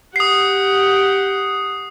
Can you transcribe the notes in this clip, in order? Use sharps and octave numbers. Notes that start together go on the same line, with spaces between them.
G4 F#5 D#6 C7